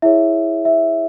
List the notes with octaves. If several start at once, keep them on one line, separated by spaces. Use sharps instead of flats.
E4 G#4 C#5 E5
E5